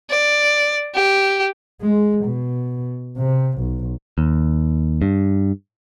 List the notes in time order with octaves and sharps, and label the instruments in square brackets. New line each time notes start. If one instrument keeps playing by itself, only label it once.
[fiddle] D5
G4
[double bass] G#3
B2
C3
B1
[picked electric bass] D#2
G2